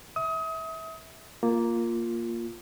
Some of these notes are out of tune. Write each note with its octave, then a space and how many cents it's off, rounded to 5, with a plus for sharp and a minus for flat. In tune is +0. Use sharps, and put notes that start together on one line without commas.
E5 -20 D#6 +30
A#3 +0 F4 +0